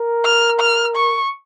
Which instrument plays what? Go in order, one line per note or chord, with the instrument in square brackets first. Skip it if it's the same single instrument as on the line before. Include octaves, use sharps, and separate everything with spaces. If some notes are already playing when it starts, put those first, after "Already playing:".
Already playing: [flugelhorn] A#4
[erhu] F6
F6
C#6